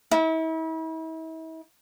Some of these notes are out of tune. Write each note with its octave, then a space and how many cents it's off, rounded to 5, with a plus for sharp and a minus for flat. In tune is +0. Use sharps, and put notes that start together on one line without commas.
E4 -40